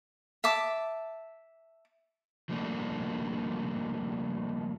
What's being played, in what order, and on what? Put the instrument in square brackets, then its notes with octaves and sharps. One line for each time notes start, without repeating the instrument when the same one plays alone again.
[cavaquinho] E5 A5 D6
[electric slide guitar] F3 G3 A3 A#3 D4